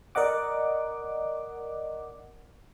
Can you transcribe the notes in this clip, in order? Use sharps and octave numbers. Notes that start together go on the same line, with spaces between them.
A#4 D5 D#5 F#5 D6